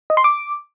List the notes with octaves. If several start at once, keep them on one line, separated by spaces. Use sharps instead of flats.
D#5
C6
D6